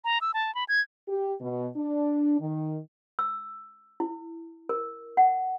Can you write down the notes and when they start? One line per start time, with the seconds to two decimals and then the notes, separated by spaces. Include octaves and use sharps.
0.04 A#5
0.21 E6
0.34 A5
0.55 B5
0.68 G#6
1.08 G4
1.41 B2
1.76 D4
2.39 D#3
3.19 E6
4.00 E4
4.69 A#4
5.17 F#5